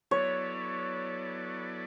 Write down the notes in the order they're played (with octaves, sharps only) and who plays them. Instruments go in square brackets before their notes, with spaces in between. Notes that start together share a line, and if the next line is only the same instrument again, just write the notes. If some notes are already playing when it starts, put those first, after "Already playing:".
[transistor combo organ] F#3 B3 E4 A4 D5 [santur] C#5